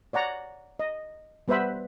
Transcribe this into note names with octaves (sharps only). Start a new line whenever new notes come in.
C#5 D5 F#5 A#5
D#5
G3 B3 B4 C5 E5 B5